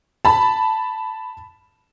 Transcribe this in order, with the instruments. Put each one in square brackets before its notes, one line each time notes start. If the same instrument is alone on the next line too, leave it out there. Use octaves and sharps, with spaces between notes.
[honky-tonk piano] A5 B5